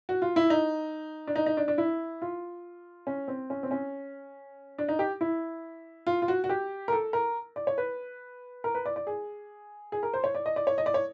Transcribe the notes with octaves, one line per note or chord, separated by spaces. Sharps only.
F#4
F4
E4
D#4
D4
D#4
D#4
D4
D4
E4
F4
C#4
C4
C#4
C4
C#4
D4
D#4
G4
E4
F4
F4
F#4
F#4
G4
A#4
A4
A#4
D5
C#5
B4
A#4
B4
D5
D5
G#4
G#4
A#4
C5
C#5
D5
D#5
D5
C#5
D#5
D5
C#5